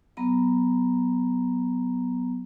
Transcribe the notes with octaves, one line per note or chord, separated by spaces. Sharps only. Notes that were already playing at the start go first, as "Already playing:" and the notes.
F#3 B3 A#5